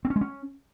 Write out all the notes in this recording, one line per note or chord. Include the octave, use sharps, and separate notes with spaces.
C4
C#4
G#3
C#4